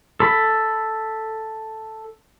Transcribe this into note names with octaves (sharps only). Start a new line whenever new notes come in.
A4 B5